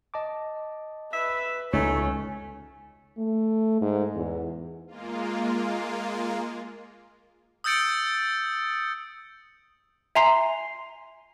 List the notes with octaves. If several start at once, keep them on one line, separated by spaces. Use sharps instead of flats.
D#5 A5 D6
B4 E5
C#2 A3 C#4 D#4 C#5
A3
G#2
E2
G#3 A#3 F4
D#6 E6 G6 A6 C#7 D7
E5 G#5 A#5 C6 C7